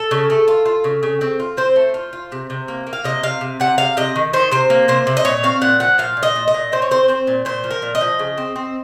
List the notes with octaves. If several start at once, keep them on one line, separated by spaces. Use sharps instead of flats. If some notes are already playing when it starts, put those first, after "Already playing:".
Already playing: A4
C#3
A3
F4
F4
C#3
C#3
C4
F4
C4 C5
A3
F4
F4
C3
C3
A#3
A#3
F5
C3 D#5
C3 F5
C3
C3 F#5
C3 F5
C3 D#5
D#3
D#3 C5
C3 C5
A#3
C3 C5
C3
D#5
A#2 C#5
C4 F5
A#2 F#5
F3 F#5
A#2 F5
A#2
D#5
A#2
D#5
A#2
C4 C5
C#5
C4 C5
C4 C5
A#2
A#2 C5
F3
A#4
A#2
D#5
F3
C#3
C4
C4